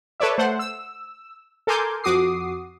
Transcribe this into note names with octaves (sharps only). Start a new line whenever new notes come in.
A4 B4 C#5 D5 E5
A3 C5 F#5
E6
A4 A#4 G#5 C6 D6 G6
F2 F#4 D6 D#6 C7